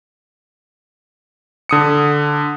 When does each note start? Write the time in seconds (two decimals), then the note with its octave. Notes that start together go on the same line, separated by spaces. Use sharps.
1.69 D3 D#6 C#7